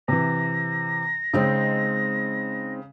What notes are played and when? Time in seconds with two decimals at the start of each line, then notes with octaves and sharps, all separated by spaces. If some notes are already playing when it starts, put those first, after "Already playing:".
0.08 C3 E3 A#6
1.34 C#3 G#3 C4 D#4